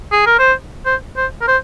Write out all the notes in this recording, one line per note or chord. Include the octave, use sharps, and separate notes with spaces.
G#4
A#4
C5
C5
C5
A#4
C5